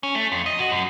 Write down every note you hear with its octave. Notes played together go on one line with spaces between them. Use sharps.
C#4
A3
F2
D#5
F#4
F#2